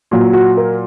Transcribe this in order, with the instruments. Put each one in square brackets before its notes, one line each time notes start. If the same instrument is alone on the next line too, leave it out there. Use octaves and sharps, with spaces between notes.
[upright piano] A#2 F#3
F#4
A#4